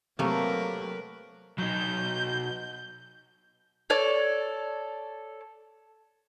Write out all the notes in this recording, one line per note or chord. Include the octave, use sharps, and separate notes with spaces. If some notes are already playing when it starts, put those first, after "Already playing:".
C3 F#3 A3 A#3 A#4 B4 C#6
F#3 D#4 G6
A4 C#5 D5